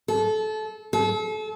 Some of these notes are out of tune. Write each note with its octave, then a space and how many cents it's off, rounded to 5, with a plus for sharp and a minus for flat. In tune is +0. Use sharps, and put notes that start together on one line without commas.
A4 -25
A4 -35